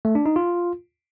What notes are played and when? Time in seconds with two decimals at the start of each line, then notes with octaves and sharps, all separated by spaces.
0.05 A3
0.15 D4
0.26 D#4
0.36 F4